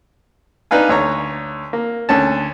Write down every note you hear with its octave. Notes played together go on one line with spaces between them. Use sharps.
D4 D#4 B4 F5 G#5
D2 C#5 A#5
A#3
D2 C#4 A5